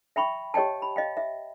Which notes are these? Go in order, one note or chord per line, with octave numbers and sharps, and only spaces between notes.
E5 G5 B5 C#6
G4 C#5 D#5 G5 A5
B5
D#5 F5 G5
E5